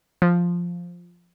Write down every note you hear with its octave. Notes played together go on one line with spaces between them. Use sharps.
F3